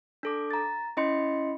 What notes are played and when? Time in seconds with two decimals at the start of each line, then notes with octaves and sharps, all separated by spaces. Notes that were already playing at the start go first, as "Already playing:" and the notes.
0.23 D4 A4 D6
0.51 A#5 A6
0.97 C#4 E4 D#5 B5 C6 C#7